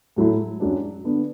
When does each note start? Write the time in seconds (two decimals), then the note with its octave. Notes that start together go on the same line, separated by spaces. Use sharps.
0.16 A2 F#3 A3 E4
0.60 F#2 F#3 D4
1.04 D3 B3 D4